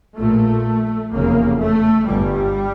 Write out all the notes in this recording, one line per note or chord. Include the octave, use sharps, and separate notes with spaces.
A#1 A#2 A3
F1 E2 C#3 A#3
A3
G1 G2 G3